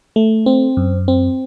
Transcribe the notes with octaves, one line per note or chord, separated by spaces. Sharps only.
A3
C4
F#2
C4